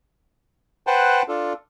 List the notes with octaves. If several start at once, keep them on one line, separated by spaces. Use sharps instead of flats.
B4 C5 F#5 G5 A5
D4 F4 A4